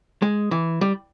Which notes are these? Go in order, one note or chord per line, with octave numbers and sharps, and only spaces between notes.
G#3
E3
G3